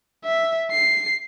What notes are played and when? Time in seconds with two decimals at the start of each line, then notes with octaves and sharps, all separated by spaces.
0.25 E5
0.72 C7